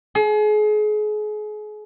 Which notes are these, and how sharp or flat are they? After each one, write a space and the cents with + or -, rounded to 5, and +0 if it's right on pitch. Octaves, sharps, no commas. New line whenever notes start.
G#4 +35